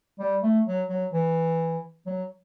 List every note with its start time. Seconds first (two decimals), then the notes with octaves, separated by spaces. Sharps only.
0.19 G3
0.43 A3
0.66 F#3
0.89 F#3
1.13 E3
2.06 F#3